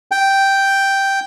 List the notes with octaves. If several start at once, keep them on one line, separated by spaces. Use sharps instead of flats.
G5